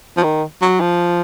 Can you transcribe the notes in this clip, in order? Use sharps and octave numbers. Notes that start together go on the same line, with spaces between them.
F3
D#3
F#3
F3